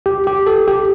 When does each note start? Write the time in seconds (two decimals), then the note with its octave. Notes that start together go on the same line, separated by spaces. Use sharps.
0.06 G4
0.27 G4
0.47 A4
0.68 G4